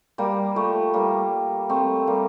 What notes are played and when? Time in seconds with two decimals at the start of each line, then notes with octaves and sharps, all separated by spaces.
0.18 G3 A#3
0.56 F3 A3
0.94 G3 A#3
1.69 A3 C4
2.07 G3 A#3